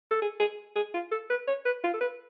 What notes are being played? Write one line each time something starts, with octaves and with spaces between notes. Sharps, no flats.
A4
G#4
G#4
G#4
F4
A4
B4
C#5
B4
F4
A4
B4